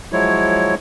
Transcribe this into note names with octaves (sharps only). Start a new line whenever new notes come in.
F3 F#3 G#3 E4 C#5